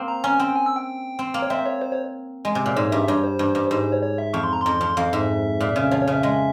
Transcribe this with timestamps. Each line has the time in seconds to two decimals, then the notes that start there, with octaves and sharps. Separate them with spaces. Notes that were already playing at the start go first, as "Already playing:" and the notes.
Already playing: A#3 C4
0.08 A#5
0.24 C#4 G#5
0.39 C4 G5
0.56 G#5
0.66 E6
0.76 G5
1.19 C4
1.34 A#3
1.42 C#5
1.50 C4 E5
1.66 C#5
1.82 C5
1.92 C#5
2.45 G#3
2.55 C3
2.66 A#2
2.76 G#2 C#5
2.92 G2 E5
3.04 E5
3.08 G2 C#5
3.24 C5
3.39 G2
3.55 G2
3.71 G#2 C5
3.81 C5
3.92 C#5
4.02 C#5
4.18 E5
4.33 F2 C#6
4.43 C6
4.53 A#5
4.61 F2 C6
4.81 F2
4.97 F2 F5
5.13 G#2 E5
5.60 A#2
5.76 C#3
5.91 F3 C#5
6.02 C#5
6.07 C#3
6.13 E5
6.23 G#3